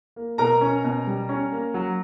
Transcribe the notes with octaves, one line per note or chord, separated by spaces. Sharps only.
A#3
B2 A#4 A#5
C#4
B2
G3
C#4
A#3
F#3